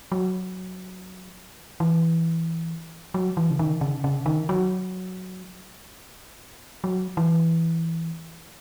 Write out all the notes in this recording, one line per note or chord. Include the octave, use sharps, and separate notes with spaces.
F#3
E3
F#3
E3
C#3
D#3
C#3
C#3
D#3
F#3
F#3
E3